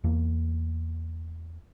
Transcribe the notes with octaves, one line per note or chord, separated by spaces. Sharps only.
E2 A#3